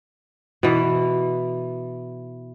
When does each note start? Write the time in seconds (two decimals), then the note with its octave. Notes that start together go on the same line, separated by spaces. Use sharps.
0.63 B2 E3